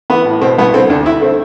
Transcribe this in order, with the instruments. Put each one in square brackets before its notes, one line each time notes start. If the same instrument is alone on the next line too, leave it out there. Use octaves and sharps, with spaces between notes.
[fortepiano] E3 B3
A2
B2 C4
C2 B3
D3 C4
D2 D4
D3 E4
A3 C4